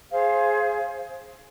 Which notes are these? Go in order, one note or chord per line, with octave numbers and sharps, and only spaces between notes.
G#4 C5 F5